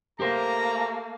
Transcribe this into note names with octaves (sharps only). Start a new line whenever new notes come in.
A3 A#3 G4 A#4 C5 A#5